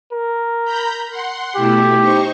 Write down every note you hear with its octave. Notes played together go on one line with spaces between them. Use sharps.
A#4
A#5 B5 G6
F#5 C6
B2 A3 E4 G4
D#4 C5 C#6